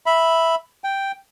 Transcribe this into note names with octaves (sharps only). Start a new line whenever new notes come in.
E5 B5
G5